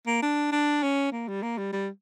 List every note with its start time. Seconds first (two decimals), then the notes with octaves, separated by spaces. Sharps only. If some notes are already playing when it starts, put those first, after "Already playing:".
0.07 A#3
0.22 D4
0.52 D4
0.83 C#4
1.12 A#3
1.28 G3
1.43 A#3
1.58 G3
1.73 G3